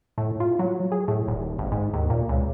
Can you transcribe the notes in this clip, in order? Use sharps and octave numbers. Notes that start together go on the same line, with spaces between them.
A2
F4
F#3
G#4
A2
D#1
G#1
G#2
D#2
A#2
C#2